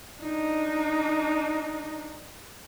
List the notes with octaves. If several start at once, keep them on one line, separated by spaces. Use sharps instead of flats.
D4 D#4